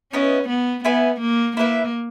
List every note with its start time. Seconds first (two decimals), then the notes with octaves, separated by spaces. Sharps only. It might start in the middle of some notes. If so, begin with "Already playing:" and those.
0.13 B3 C#4 E4 B4 D#5
0.49 B3
0.84 B3 E4 B4 E5 G#5
1.21 A#3
1.57 A#3 E4 B4 E5